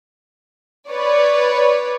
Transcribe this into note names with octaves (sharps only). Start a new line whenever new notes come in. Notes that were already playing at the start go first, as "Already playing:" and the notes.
B4 C#5 D5